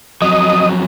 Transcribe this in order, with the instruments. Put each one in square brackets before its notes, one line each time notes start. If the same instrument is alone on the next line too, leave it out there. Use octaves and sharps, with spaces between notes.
[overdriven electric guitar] F2 F#3 [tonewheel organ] D#5 D#6